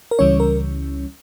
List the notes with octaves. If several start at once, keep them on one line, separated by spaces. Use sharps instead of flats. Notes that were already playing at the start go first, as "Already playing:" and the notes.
A#4
C#2 C#3 E3 G3 C#4 C#5
A#4